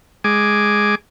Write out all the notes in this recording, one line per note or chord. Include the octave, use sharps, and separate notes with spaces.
G#3 G#5 D6